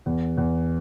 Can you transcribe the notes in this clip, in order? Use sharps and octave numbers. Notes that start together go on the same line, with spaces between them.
E2
E2